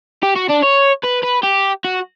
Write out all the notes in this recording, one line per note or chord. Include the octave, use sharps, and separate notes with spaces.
G4
F#4
D4
C#5
B4
B4
G4
F#4